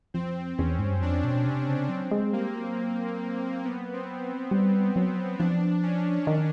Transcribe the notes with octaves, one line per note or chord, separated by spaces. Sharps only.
F2 C4
E2 C#4
G#2
G2
F#2
F2 D4
B2
C3 C#4
C#3
F#3 C4
G#3
G3 A#3
F#3
B3
C4
G3
F#3
F3 D4
C#4
D#3